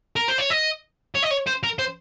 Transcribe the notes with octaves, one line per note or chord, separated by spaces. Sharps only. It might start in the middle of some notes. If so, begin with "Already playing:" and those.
A#4
C5
C#5
D#5
C#5
D#5
C#5
C5
A#4
C5